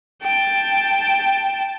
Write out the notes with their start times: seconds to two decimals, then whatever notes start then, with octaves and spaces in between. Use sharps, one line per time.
0.23 G5 A5